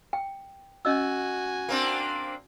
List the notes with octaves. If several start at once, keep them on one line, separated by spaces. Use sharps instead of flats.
G5
C#4 F#4 D#5 G#5 E6
A#3 C4 D4